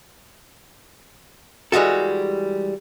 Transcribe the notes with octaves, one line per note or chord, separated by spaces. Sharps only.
E3 G3 G#3 F#4 A4